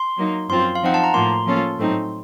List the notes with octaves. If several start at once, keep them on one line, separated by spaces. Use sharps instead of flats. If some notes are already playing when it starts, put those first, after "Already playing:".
Already playing: C6
F#3 A#3 D#4
F#2 F3 C4 F4 C6
F5
F3 C4 D#4 F#5
A5
A#5
A2 F3 A#3 C6
F3 A#3 C#4 F4 A4
A2 F#3 A3 C4 D#4